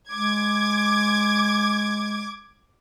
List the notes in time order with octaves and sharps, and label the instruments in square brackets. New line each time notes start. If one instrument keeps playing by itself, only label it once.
[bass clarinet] G#3 [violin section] D6 G#6